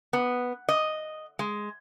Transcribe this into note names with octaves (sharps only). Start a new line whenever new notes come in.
B3
D#5
G#3